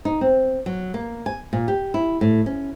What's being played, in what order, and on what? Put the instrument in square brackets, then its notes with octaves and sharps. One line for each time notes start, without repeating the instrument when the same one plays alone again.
[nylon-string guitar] D#4
C4
F#3
A#3
G#5
A#2
G4
E4
A2
C#4